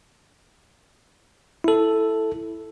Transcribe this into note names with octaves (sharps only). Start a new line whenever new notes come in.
E4 A4